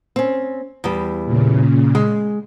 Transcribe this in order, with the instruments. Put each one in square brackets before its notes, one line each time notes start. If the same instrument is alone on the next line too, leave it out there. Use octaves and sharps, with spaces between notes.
[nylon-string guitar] C4 C#4
E2 G3
[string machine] A#2 C#3
[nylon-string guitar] G#3